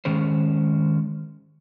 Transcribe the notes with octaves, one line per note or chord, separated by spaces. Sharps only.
D#3 G#3 C#4 C5